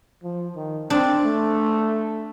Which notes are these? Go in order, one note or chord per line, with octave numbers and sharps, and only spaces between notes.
F3
D#3
C4 D4
A3